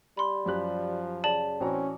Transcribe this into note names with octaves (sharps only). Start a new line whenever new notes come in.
G3 B5 C6
F#2 F3 G4 F#6
C#3 D5 A5 F#7
A1 C4 C#4 F#4 A#5